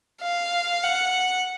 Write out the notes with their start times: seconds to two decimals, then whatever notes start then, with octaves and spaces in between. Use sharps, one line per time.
0.22 F5
0.83 F#5